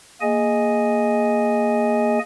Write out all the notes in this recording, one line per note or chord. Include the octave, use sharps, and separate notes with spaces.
A#3 G#4 D#5 G#5